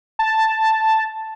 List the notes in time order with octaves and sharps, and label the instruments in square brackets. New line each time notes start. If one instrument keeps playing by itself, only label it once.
[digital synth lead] A5